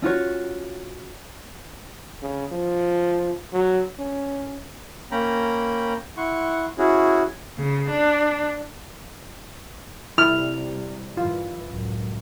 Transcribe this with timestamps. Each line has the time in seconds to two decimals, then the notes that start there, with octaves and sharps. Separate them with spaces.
0.02 C#4 F4 F#4 C#5
2.22 C#3
2.52 F3
3.53 F#3
3.99 C#4
5.11 A#3 C#4 G5 A#5 B5
6.17 E4 F#5 C6 C#6
6.78 C#4 E4 F#4 G#4
7.57 C#3
7.89 D4
10.18 C3 G3 E4 F6
11.17 G2 E3 F4
11.67 C#2 F#2 A2